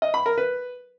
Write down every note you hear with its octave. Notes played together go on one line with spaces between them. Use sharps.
D#5
B5
A#4
B4